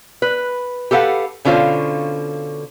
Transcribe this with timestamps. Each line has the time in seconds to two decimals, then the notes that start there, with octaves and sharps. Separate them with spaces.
0.22 B4
0.91 G4 A4 B4 F5 F#5
1.45 B2 D3 C#4 F4 C5 F5